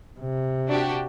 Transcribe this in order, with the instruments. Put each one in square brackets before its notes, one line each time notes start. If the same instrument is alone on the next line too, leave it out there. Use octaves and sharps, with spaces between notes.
[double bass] C3
[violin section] D4 F#4 G4